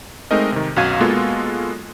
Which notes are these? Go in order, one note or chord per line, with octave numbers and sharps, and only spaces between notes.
G#3 A3 C4 D#4 A#4 D#5
C3 D#3
B1 F#2 F#4 F5 G#6 D#7
G#3 A#3 B3 F4 F#4 A4